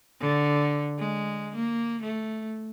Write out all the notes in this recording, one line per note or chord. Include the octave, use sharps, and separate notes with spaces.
D3
G#3
A#3
A3